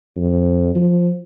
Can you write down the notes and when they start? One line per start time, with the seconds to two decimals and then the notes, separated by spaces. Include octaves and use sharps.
0.17 F2
0.75 F3